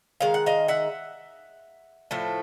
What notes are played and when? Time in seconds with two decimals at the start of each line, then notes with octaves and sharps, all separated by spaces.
0.20 D#3 G#3 F5
0.34 F#5
0.46 D#5 F5
0.68 E5 F#5
2.11 A2 F3 A3